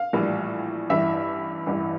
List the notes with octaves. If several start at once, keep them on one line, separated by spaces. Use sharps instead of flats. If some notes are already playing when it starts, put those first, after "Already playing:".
Already playing: F5
A#1 A2 E3 G3
A1 G2 E3 E5
A1 G2 E3